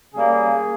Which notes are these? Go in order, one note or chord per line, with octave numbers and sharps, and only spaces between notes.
C#3 G3 A#3 G#4